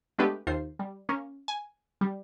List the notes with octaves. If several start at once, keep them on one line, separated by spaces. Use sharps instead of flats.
G#3 A3 B3 D4 G4 B4
D#2 F4 C5 C7
G3
A#3 C#4
G#5
G3